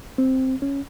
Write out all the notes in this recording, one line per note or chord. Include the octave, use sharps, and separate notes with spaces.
C4
C#4